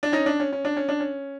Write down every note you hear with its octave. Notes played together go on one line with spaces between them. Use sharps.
D4
C#4 D#4
D4
C#4
C#4
D4
C#4
D4
C#4